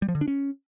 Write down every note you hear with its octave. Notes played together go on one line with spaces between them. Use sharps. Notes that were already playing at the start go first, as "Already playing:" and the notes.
G3
F3
D3
D4
C#4